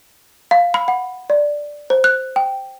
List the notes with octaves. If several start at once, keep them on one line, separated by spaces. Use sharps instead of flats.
F5
B5
F#5
D5
C5
F#6
G5